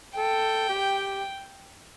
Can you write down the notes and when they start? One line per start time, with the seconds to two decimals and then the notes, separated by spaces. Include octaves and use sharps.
0.17 A4 G5
0.69 G4